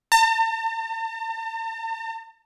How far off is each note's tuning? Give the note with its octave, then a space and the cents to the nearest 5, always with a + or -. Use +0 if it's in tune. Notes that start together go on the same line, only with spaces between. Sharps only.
A5 +45